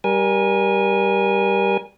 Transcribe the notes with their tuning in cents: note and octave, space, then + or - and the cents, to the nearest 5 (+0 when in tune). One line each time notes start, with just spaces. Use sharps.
G3 +0 A#4 +30 G#5 -10